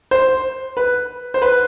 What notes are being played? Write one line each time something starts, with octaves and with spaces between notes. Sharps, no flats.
C5
B4
C5
B4